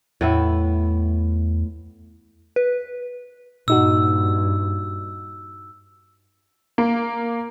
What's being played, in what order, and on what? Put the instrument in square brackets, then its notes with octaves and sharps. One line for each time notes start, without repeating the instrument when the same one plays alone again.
[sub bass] E2 [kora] A2 B3 E4
[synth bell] B4
[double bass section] G2 [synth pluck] A#2 D#4 F#4 [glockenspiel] E6
[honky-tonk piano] A#3